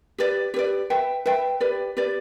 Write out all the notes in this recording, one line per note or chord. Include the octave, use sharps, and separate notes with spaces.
G4 B4 D5
G4 B4 D5
B4 E5 G5
B4 E5 G5
G4 B4 D5
G4 B4 D5